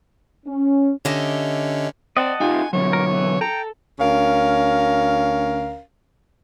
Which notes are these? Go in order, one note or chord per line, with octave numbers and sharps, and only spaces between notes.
C#4
D3 C#4 G4 D#5 E5
C4 D5 D#5 F#5 A5
D#4 F4 G4 G#5
B2 D3 F#3 C#5
A#4
E3
A4 G5 A#5
D2 C#4 A#4 F5